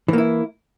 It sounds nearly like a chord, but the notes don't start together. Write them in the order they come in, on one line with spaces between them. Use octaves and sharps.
E3 A#3 E4